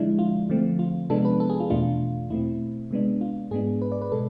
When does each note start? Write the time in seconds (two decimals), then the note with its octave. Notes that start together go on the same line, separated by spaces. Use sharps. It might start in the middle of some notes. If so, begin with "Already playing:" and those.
Already playing: D3 F3 G#3 D4 E4
0.19 F4
0.49 D3 F3 A3 C4
0.79 F4
1.10 C3 F3 G#3 B3 D4 A4
1.25 B4
1.40 A4
1.50 G#4
1.60 F4
1.70 E2 B2 A3 D4 F4
2.30 B2 A3 C4 E4
2.91 C3 G#3 B3 D4
3.21 F4
3.51 G#2 G#3 B3 D4 G#4
3.82 B4
3.92 D5
4.02 B4
4.12 B2 G#3 A4